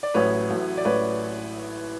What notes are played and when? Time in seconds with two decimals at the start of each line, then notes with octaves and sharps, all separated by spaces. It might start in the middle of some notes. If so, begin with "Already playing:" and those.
0.03 D5
0.14 A1 A2 F#3 B4 C#5
0.50 A1 A2 F#3
0.77 D5
0.85 A1 A2 F#3 B4 C#5